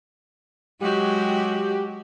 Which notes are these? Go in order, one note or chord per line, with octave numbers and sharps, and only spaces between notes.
F#3 G#3 F#4 G4